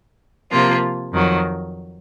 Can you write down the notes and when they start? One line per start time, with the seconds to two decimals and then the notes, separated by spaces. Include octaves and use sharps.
0.51 C3 F3 A#3 F4
1.12 F2 D#3 F#3